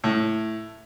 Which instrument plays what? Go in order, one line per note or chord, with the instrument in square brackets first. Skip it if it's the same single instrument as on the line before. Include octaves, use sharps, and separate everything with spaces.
[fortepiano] A2